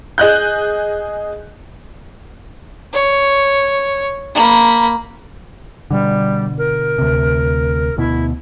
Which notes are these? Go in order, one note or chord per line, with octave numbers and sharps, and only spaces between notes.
G#4 D#5 F#6 G6
C#5
A#3 B5
B2 D3 G3
A#4
D2 C3
D2 B2 E4